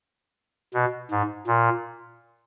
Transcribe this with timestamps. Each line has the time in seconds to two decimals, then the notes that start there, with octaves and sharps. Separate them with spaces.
0.74 B2
1.11 G#2
1.47 A#2